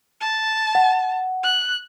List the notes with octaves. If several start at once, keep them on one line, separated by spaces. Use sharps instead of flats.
A5
F#5
F#6